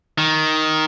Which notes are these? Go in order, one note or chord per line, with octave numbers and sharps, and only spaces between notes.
D#3